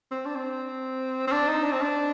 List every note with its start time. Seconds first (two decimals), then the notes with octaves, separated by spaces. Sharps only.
0.11 C4
0.26 D4
0.36 C4
1.27 C4
1.32 D4
1.48 D#4
1.63 D4
1.72 C4
1.82 D4